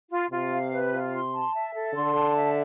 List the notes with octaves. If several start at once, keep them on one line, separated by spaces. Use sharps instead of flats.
F4
C3 F4
F5
B4
F4
C6
A5
E5
A4
D3 C6
A5
E5